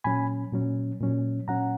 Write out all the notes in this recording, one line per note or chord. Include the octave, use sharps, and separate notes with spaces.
A#2 F#3 C#4 G#5 B5
A#2 F#3 C#4
A#2 F#3 C#4
A#2 F#3 C#4 F#5 A#5